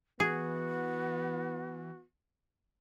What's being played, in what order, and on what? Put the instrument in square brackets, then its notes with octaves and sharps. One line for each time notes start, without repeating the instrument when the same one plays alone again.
[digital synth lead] E3 [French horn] B3 [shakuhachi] F#4 [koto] G#4